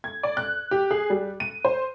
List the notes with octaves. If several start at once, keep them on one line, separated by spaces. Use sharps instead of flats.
G#6
D5
F#6
G4
G#4
G3
D#7
C5